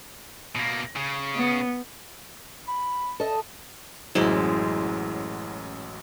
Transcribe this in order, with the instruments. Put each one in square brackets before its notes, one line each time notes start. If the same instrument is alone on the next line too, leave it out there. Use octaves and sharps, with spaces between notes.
[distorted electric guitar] B2 A#3
C#3
[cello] B3
[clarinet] B5
[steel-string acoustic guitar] A4 D#5 E5
[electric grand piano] A1 F#2 F#3 [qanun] G#3 E4 C5